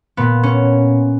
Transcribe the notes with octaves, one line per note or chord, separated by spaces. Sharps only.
A#2 B3
C#4